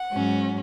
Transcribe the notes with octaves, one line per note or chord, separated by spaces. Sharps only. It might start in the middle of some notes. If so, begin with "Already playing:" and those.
Already playing: F#5
G#2 F#3 C#4